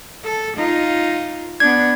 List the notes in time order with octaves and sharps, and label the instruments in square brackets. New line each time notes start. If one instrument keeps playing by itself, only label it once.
[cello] A4
D#4 F4
[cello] B3 D4 [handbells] G#6